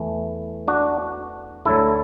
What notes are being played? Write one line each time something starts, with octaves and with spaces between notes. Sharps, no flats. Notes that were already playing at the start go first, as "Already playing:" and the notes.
Already playing: E2 E3 A3
D4 F#4
D2 D3 F#3 A3 E4 A4